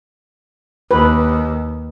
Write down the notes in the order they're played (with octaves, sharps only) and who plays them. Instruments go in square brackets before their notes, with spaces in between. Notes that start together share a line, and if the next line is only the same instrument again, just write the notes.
[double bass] D#2 [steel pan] B4